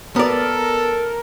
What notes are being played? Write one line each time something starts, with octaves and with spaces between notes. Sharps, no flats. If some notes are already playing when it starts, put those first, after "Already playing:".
B3 A4 A#4 D5